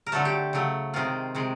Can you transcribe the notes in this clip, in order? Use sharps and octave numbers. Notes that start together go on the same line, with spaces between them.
A#4
D3 F#3 A3 A4
G4
C#3 F#3 A3
C3 D#3 G#3 F4
C3 D#3 G#3